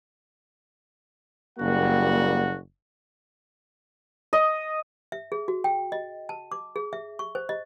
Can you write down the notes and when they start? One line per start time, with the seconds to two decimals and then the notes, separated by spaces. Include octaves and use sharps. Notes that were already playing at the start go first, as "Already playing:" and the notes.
1.58 F#1 G3 A#3 F#4 F#5
4.33 D#5
5.12 E5
5.32 G#4
5.48 F#4
5.64 G5
5.92 D#5
6.29 A5
6.52 D6
6.76 G#4
6.93 E5
7.19 C#6
7.35 C5
7.49 D#5